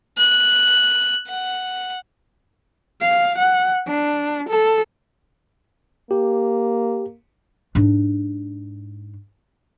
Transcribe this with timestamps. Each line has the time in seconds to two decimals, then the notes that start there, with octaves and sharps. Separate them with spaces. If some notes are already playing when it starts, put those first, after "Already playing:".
0.18 F#6
1.27 F#5
3.02 F5
3.38 F#5
3.87 D4
4.49 A4
6.11 A#3 G4
7.75 G#2 D4